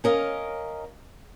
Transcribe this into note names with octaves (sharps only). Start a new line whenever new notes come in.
C#4 A#4 D#5 F5